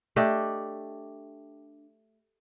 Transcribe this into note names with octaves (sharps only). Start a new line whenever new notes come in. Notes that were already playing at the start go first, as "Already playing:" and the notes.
A3 D4 G4 D#5